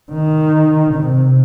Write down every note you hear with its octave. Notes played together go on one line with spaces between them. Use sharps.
D#3
C3